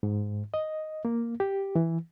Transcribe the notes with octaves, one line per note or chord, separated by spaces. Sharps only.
G#2
D#5
A#3
G4
E3